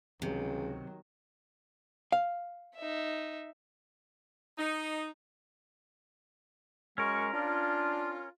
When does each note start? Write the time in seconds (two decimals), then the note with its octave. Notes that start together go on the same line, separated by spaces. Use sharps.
0.22 C#2 C3 D#3 F#3
2.12 F5
2.76 D#4 E5
4.58 D#4
6.98 F#2 G#3 C#4 F#4 A#4 C#6
7.33 D4 F4